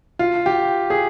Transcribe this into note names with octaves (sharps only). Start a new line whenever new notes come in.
F4
G4
G#4